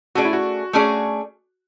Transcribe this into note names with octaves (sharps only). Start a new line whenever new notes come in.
A3 C#4 F#4 G#4 D5
E4
F#4
A3 C#4 G#4 D5